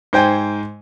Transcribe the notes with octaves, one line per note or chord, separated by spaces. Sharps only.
G#2 C5 G5 G#5